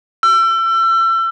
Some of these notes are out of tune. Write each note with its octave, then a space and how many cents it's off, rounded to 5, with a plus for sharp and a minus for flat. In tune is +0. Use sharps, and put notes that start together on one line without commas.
E6 +35